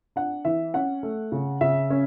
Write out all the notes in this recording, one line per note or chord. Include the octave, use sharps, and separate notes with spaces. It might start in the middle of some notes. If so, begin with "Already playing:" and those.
D4 F#5
E3 E5
C#4 F#5
A3
C#3
C#3 E5
C#4